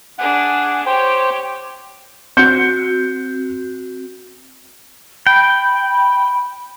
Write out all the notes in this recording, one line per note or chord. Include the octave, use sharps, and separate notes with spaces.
D4 G#4 F#5
G4 C5 C#5 G5
C4 F#4 G6 C#7
G5 B5